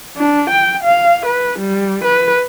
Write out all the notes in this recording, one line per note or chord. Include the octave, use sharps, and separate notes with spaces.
D4
G5
F5
B4
G3
B4